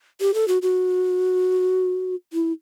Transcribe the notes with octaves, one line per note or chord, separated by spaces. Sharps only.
G4
A4
F#4
F#4
E4